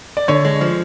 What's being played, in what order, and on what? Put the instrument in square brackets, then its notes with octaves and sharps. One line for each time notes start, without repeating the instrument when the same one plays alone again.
[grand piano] D5
[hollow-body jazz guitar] D3 [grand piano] C#5
[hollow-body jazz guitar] G#3
F3